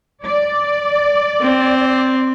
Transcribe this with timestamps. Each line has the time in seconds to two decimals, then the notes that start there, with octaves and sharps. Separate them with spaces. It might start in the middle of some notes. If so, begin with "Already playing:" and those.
0.24 D5
1.41 C4